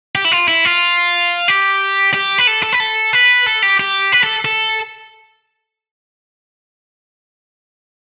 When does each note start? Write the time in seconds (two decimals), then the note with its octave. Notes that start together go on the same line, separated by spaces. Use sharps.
0.15 G4
0.25 E4
0.32 F4
0.48 E4
0.65 F4
1.48 G4
2.14 G4
2.38 B4
2.47 A4
2.63 A4
2.73 B4
2.80 A4
3.13 B4
3.46 A4
3.62 G4
3.80 G4
4.12 B4
4.23 A4
4.45 A4